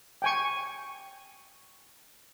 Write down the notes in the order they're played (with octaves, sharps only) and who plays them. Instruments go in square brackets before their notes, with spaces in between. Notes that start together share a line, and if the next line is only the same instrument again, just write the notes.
[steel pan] G5 G#5 C#6